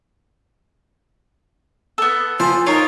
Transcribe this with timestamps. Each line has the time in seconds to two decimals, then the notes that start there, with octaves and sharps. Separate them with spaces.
1.98 B3 A4
2.40 F3 C5 G#5
2.67 D#4 F4 A#4 C#5